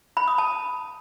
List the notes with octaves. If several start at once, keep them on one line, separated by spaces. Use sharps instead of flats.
B5
D#6
A5